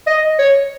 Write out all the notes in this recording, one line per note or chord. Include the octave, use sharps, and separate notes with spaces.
D#5
C#5